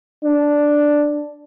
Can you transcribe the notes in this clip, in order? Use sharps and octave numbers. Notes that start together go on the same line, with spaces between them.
D4